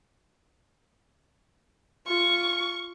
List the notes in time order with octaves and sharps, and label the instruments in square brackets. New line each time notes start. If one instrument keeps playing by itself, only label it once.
[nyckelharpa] F4 [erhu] C#6